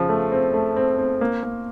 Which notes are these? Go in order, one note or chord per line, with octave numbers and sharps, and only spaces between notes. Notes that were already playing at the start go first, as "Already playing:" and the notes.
Already playing: C#3 F3
A3
C4
A3
C4
C4
A#3
A#3